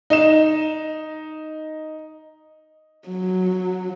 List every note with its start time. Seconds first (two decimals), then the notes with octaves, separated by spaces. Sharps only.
0.10 D#4 E7
3.08 F#3